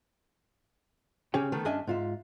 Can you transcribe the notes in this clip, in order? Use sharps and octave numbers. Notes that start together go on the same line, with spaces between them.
C#3 C#4 G4 C#5 G5
D#3 A3 B3
G2 C#4 D4 D#5 E5 G#5
G#2 F4 E5